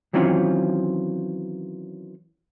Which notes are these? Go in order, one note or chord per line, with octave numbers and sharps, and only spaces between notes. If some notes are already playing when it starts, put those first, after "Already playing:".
D#3 E3 F#3 C4 C#4 F4